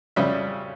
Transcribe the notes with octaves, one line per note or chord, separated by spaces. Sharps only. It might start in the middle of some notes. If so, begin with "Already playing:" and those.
F2 C#3 G3 C#4 E5